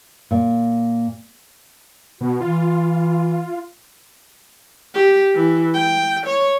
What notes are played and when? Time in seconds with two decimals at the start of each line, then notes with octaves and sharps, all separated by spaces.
0.31 A#2
2.21 B2 F#4
2.41 E3 F4
4.94 G4
5.35 E3
5.74 G5
6.26 C#5